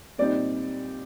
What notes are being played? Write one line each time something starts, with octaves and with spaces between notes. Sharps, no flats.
A#2 G3 C4 D#4 D5